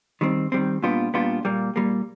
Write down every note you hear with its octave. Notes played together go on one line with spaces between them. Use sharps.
D#3 G3 C4
D#3 G3 C4
A#2 G3 B3 D4 F4
A#2 G3 B3 D4 F4
A#2 G3 A#3
A#2 G3 A#3